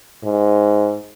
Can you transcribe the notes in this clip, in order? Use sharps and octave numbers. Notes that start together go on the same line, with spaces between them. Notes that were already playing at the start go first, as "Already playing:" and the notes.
G#2